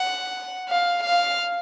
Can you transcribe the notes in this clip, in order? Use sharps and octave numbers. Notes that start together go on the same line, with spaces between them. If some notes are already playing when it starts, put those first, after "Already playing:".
Already playing: F#5
F5
F5